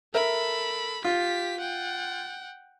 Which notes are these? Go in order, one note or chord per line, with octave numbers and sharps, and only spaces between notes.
A4 A#4 E5 B5
F4 G4 B6
F#5 G5